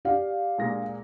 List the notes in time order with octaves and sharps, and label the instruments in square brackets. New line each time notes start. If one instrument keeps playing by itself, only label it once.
[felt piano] G4 D5 F5
[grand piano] A#2 G#3 A#6